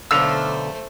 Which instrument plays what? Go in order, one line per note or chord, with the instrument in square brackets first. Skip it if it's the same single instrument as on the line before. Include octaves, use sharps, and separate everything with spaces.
[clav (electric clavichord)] B1 D3 F5 [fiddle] A3 C5 [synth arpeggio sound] E6